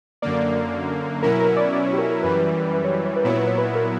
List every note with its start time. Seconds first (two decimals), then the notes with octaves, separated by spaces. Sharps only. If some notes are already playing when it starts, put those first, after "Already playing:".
0.22 F#2 D3 A#3 D5
1.23 B2 F#3 C#4 E4 A#4
1.40 A#4
1.57 D5
1.73 D5
1.86 C#5
1.93 G4
1.98 A#4
2.11 A#4
2.23 F#2 E3 G3 B4
2.74 B4
2.84 C#5
2.94 B4
3.06 C#5
3.16 B4
3.24 A#2 F#3 B3 E4 C#5
3.37 B4
3.47 C#5
3.58 B4
3.75 A#4